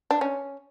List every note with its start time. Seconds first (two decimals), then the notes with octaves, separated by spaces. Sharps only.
0.11 D4
0.21 C#4